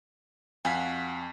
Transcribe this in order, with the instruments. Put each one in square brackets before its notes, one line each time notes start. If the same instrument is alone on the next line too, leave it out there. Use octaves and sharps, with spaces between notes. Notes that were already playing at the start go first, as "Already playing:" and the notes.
[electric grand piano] F2 F5 B6 [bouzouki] F#4 G#5